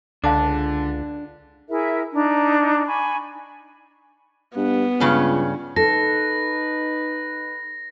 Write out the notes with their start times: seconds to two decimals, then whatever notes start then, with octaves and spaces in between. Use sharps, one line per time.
0.24 C#2 D3 D4 F5 A5 D6
1.70 E4 G#4 A#4 E5
2.13 D4 D#4 A#5
2.87 G#5 B5 C#6
4.57 G2 B3
5.00 C#2 G2 C#3 C#4
5.76 D#4 A4 B4 A#6